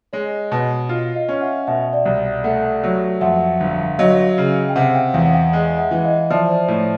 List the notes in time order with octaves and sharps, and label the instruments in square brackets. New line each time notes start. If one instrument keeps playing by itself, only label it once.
[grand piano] G#3 [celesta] C#5 D#5
[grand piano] B2
[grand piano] F4 [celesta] D#5 F5
[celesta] D#5 F5
[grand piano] C#4
[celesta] E5 F#5
[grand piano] B2 [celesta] E5 F#5
[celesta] D5 E5
[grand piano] C2
[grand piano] A3 [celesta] E5 F#5
[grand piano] F#3
[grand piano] F2 [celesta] E5 F#5
[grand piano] G1
[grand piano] F#3 [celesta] D#5 F5
[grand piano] C#3
[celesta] G5
[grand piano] C3 [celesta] E5 F#5
[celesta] F5 G5
[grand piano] E2 [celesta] F5 G5
[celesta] F#5
F5 G5
[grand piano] G#3
[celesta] E5 F#5
[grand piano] E3
[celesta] D#5 F5
[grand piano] F3 [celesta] D5 E5
[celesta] C5 D5
[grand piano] A2 [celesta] C#5